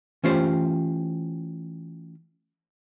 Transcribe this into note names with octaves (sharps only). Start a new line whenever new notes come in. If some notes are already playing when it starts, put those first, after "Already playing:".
E3 A3 C#4 F4 G4 C5